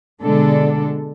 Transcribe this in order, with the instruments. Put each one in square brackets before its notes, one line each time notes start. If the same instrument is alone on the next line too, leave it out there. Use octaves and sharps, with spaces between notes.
[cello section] B2 D3 G#3 D4 A4